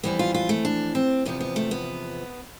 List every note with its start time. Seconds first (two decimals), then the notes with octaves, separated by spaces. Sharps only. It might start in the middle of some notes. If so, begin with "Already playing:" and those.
0.03 F2 E3 G3 B3
0.19 F4
0.34 F4
0.49 A3
0.65 D4
0.95 C4
1.25 E2 C3 F3 B3
1.40 B3
1.56 A3
1.71 B3